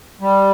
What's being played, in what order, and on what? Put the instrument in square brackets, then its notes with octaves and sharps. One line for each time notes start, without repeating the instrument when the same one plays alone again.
[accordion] G3